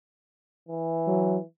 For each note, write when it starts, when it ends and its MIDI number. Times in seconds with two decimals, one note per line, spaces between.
0.68 1.44 52
1.07 1.38 54